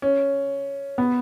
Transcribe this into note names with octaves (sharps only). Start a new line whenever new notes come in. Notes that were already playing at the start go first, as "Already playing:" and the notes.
C#4
B3